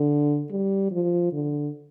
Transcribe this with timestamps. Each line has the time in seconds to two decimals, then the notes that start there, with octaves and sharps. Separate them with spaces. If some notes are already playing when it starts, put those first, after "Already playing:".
Already playing: D3
0.51 G3
0.91 F3
1.32 D3